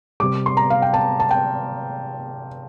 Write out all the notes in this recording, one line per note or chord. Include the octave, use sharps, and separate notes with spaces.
C3 G3 D6
C6
A#5
F5
G5
A5
A5
G5